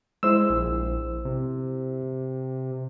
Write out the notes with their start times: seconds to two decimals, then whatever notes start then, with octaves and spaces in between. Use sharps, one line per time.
0.23 G#3 E4 C5 E6
0.50 A#1
1.25 C3